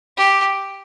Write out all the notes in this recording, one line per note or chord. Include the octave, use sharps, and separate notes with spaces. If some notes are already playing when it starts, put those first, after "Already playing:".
G4